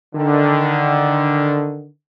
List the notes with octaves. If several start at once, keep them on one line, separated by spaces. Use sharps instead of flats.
D3 D#3